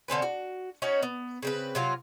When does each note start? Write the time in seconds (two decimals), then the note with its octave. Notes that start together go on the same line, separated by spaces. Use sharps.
0.08 D3 C4 C#4 B4
0.22 F#4
0.82 C#4 D#4 F#4 C#5
1.03 B3
1.43 C#3 C4 B4
1.75 C3 F#3 F4